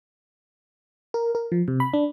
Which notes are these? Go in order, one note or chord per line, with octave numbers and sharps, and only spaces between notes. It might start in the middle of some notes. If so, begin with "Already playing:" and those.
A#4
A#4
F3
C3
B5
D4